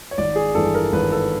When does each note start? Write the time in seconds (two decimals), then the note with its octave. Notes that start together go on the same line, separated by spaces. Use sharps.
0.11 C#5
0.18 G#1 D5
0.36 G#4
0.55 G2 E3 A4
0.74 A#4
0.92 G#1 B4
1.12 A4